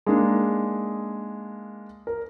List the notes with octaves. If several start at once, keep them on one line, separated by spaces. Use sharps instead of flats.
G#3 A#3 D4 D#4
A#4